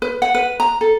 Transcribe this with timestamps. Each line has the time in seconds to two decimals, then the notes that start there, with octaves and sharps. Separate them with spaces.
0.02 B4
0.22 F#5
0.35 B4
0.60 A#5
0.81 A4